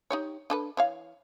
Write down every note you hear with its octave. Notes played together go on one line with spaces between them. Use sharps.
D#4 G4 C#5
D4 A4 B4
E3 C#5 F5